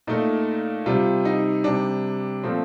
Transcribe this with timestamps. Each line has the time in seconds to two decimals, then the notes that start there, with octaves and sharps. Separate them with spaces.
0.07 A#2 A3 D#4
0.86 C3 G3 F4
1.25 D#4
1.64 C3 G3 D4
2.44 A#2 F3 A3 C4